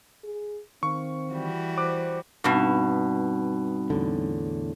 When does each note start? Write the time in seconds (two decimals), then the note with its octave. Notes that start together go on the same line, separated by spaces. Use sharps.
0.24 G#4
0.83 D#3 C4 F5 C#6
1.32 E3 G3 F#4
1.78 C5 D6 F#6
2.44 G2 B2 G3 C4 D#4
3.90 E2 A2 D3